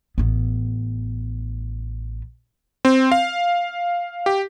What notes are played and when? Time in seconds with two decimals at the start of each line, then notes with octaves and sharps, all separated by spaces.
0.18 A1 B3
2.85 C4
3.12 F5
4.26 G4